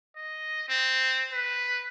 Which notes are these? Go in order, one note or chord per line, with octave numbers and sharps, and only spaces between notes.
D#5
C4
B4